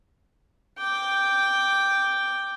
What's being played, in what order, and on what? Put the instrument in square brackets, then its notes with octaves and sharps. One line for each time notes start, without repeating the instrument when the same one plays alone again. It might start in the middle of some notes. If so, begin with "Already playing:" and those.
[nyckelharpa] G5 D6